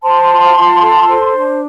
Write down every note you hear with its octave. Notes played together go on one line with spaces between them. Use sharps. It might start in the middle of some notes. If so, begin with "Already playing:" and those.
C5 A5 C6
F4
F4
A4
C5
D4